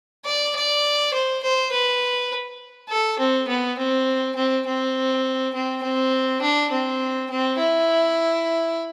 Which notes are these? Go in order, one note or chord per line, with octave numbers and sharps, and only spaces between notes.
D5
D5
C5
C5
B4
A4
C4
B3
C4
C4
C4
C4
C4
D4
C4
C4
E4